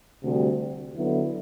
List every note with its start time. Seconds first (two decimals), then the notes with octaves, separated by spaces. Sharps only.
0.23 D2 C3 G3
0.95 D3 F#3 B3 E4